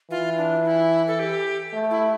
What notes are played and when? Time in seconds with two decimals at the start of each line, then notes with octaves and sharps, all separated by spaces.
0.10 E3 F4
0.37 D4
0.64 E4
1.07 A4
1.19 G4
1.73 A3
1.91 E4